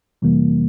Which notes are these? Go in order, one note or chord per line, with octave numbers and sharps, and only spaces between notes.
F2 C3 E3 G3 A#3